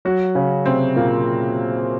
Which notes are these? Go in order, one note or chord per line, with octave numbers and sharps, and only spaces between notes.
F#3 F#4
C#3 C#4
C3 C4
A#2 A#3